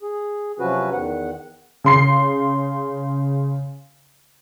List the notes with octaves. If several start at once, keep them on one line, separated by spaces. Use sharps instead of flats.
G#4
C3 F3 F#3 C#4 F#4 B4
E2 D#3 F#5
C#3 C6 C7